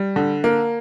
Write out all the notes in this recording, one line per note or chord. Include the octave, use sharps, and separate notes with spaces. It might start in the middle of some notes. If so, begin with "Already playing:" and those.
Already playing: G3
D3
A#3